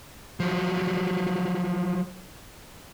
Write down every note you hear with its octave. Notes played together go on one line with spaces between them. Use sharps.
F3 F#3